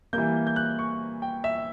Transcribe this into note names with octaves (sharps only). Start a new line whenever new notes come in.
E3 G3 A#3 G6
G6
F#6
C#6
G5
E5